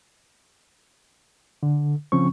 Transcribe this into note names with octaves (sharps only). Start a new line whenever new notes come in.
D3
C#3 F3 C4 C#4 C#6